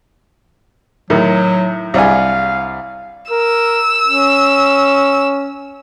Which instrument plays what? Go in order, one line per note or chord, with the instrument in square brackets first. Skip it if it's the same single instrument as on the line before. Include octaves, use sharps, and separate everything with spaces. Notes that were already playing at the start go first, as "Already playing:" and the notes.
[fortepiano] A2 D#3 [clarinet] F#3
[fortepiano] C2 D4 G#5 [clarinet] F5
[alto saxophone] A#4 [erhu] E6
[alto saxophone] C#4